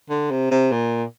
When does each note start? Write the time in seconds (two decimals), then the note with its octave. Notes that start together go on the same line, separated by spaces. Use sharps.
0.10 D3
0.31 C3
0.51 C3
0.72 A#2